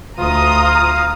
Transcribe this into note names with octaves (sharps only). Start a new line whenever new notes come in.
D2 F4 A#5 D#6
F5